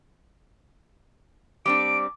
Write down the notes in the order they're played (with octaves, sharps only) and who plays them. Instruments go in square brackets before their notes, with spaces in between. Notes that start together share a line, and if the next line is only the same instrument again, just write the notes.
[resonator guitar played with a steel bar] G3 C4 D4 [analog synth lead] D6 [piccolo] D7